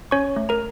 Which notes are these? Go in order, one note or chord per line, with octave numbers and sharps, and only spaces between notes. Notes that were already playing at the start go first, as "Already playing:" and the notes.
C#4 C#5 C#6
A3
A#4 A#5